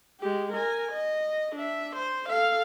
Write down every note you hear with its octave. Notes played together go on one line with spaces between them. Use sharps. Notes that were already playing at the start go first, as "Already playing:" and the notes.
G#3 G4
A#4 G#5
D#5
D4 E5
C5
A4 F5